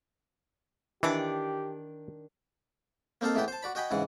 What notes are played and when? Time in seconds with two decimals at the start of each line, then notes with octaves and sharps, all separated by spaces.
1.03 D#3 E3 D4 G4 D5
3.21 A#3 C4 D#4 A4 F5
3.35 E2 A2 E3 B3 B4 G5
3.48 C5 A5
3.63 F#4 D5 B5
3.75 F#4 D#5 G5 G#5 B5
3.91 G#2 C#3 E3 F#5